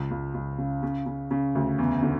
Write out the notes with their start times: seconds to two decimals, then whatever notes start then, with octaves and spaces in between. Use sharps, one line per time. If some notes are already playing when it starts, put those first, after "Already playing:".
Already playing: C#2
0.11 C#2
0.34 C#2
0.58 C#3
0.83 C#3
1.06 C#3
1.31 C#3
1.55 D2
1.78 E2
2.03 D3